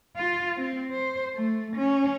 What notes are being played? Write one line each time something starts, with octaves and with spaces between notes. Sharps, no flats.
F4
C4
C5
A3
C#4